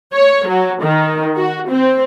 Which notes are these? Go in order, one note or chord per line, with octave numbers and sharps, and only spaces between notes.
C#5
F#3
D#3
F#4
C4